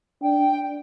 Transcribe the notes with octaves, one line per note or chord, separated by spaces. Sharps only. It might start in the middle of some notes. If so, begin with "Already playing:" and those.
D4 G5